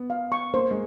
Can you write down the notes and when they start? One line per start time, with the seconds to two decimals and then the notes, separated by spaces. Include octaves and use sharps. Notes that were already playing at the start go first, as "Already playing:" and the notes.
Already playing: B3
0.10 F5
0.32 C#6
0.54 A#3 C5
0.71 G#3